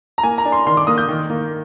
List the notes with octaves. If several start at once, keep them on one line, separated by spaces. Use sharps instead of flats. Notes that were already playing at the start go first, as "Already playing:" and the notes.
A#5
A#3 G#5
A#5
D4
C6
D#3 C6
D6
A#3 D#6
G6
D#3
A#3